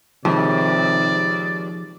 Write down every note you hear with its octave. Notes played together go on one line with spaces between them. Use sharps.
D#2 C3 F3 G#3 D5